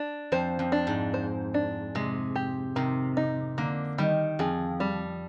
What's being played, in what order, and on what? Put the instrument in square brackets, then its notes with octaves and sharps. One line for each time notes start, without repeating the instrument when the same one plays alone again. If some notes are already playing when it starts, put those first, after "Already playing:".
Already playing: [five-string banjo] D4
[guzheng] F2 [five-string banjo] C5
[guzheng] F2
[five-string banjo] D4
[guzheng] G#2
[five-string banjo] C5
D4
[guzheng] C3 [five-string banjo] G#3
[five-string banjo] G4
[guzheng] C3 [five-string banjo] D#3
[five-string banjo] D#4
[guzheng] D3 [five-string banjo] A#3
[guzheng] D#3 [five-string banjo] G3
[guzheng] F2 [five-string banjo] G#4
[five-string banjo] G3